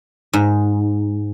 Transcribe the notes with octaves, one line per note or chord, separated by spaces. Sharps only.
G#2